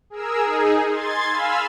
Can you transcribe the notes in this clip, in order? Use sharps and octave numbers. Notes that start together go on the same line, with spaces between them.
G#4 A#4 E6
D#4 G#4
C6 G#6 A6
F5 G#5 B5 E6 F6